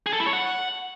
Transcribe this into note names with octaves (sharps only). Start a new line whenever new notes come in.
G#4
A4
E4
C#5
F#5